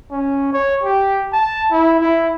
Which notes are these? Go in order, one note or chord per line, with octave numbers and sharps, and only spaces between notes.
C#4
C#5
G4
A5
E4
E4